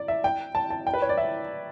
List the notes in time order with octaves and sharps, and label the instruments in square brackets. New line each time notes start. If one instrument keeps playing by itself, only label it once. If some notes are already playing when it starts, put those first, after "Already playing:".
Already playing: [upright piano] D5
E5
G5
A5
A5
G5
B4
C#5
D5
E5